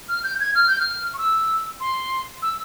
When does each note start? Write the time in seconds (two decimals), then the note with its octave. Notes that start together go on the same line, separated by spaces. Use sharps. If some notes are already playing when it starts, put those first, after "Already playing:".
0.09 F6
0.24 G6
0.40 G#6
0.55 F6
0.68 G6
0.80 F6
1.14 C#6
1.18 E6
1.80 C6
2.42 E6